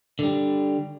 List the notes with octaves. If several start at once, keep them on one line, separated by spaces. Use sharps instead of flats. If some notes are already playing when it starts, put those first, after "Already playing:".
D3 G3